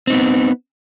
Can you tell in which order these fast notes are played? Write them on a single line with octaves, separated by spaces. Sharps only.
C4 D#4 B3